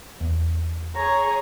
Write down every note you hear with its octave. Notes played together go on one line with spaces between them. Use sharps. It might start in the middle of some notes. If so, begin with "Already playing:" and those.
E2
G#4 C#5 A#5